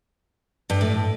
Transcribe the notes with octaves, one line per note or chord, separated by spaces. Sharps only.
G2
A2